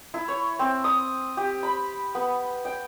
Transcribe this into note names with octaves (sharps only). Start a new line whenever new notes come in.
E4
C#5
C4
D#6
G4
B5
B3
G5